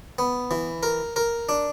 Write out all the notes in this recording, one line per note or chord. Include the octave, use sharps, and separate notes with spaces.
B3
E3
A#4
A#4
D4